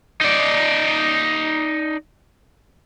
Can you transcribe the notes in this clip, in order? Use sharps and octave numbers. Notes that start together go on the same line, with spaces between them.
D#4 D5